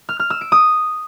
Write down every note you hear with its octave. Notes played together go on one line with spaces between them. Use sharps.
F6
F6
E6
D7
D#6